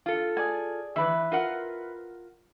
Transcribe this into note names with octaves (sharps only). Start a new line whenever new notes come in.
F4 A4
G#4 D5 G#5
D#3 E3 B4 E5
F4 A#4 F#5